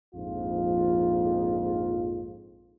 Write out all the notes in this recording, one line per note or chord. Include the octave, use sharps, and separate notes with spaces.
A#1 F2 G#2 F4